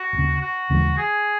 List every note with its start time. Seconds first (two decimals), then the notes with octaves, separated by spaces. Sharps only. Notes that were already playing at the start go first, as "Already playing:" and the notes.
Already playing: F#4
0.13 E1
0.16 D#2 C#3
0.41 F#4
0.70 D#2 C#3 E3 G#3
0.97 G#4